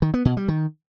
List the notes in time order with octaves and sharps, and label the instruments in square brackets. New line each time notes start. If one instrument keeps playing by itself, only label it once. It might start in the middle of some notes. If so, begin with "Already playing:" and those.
[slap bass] D#3
B3
B2
G3
D#3